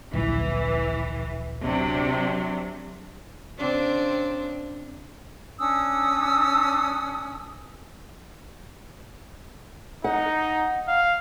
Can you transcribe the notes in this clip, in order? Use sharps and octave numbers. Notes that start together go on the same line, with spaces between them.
D1 A#1 E3
C3 F#3 D4
C#3 C4 D4
C#4 D4 D#6 E6
D#4 F#5
F5